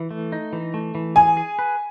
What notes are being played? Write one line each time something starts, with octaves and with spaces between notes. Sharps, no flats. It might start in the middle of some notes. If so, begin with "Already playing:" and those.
Already playing: E3
A3
D#4
E3
A3
E3
G#4 G#5
G#4
B4